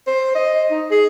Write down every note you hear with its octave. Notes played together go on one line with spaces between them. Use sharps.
C5
D#5
D#4
G#4